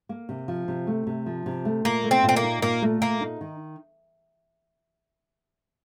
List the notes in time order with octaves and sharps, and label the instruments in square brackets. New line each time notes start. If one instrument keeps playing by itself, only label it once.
[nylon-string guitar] A#3
C3
F3
C3
A3
C3
F3
C3
A3
[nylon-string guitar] A#2 [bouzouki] A#3
[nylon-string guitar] A3
[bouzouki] C4
[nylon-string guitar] A#2
[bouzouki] C4
A#3
[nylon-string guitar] D#4
[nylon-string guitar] A#2 [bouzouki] A#3
[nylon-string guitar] A3
[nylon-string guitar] A#2 [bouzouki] A#3
[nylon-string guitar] D#4
D#3